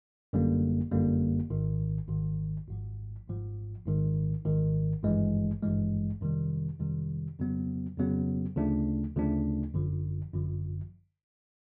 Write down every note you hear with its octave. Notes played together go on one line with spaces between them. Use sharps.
G1 F#2 D3 G3 A#3
G1 F#2 D3 G3 A#3
G#1 G#2 D#3
G#1 G#2 D#3
G#1 G#2 F3
G#1 G#2 F3
G#1 G#2 D#3
G#1 G#2 D#3
G#1 G2 E3 G#3
G#1 G2 E3 G#3
F2 C3 D#3 G3
F2 C3 D#3 G3
F2 C#3 F#3 B3
F2 C#3 F#3 B3
D2 C#3 F3 A3 D4
D2 C#3 F3 A3 D4
G1 F#2 D3 F3
G1 F#2 D3 F3